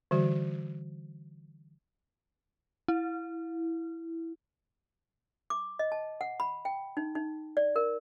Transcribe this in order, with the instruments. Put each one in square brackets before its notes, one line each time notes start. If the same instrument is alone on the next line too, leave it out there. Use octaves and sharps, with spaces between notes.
[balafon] D3 E3 G3 F#4
[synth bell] E4
[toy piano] D6
D#5
A5
F#5
B5
G5
D#4
D#4
D5
A#4